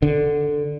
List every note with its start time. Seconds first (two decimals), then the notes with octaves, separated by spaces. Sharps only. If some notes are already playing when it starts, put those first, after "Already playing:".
0.02 D3